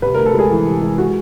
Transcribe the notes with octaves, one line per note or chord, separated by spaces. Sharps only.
C3 B4
D2 A#4
A4
G#3 G#4
E3
C3
G#3
G#3 F#4